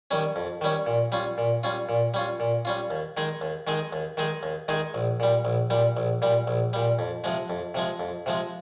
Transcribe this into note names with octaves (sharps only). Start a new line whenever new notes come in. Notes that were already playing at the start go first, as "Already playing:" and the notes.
D#3 G3 C#4
F2
D#3 G3 C#4
A#2
G3 C#4 F4
A#2
G3 C#4 F4
A#2
G3 C#4 F4
A#2
G3 C#4 F4
D#2
D#3 G#3 D#4 G#4
D#2
D#3 G#3 D#4 G#4
D#2
D#3 G#3 D#4 G#4
D#2
D#3 G#3 D#4 G#4
A#1
A#2 G3
A#1
A#2 G3
A#1
A#2 G3
A#1
A#2 G3
F2
C3 F3 G#3
F2
C3 F3 G#3
F2
C3 F3 G#3